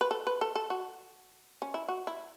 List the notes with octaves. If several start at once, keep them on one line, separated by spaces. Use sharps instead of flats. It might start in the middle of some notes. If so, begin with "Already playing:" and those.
B4
A4
B4
A4
A4
F#4
C#4
E4
F#4
E4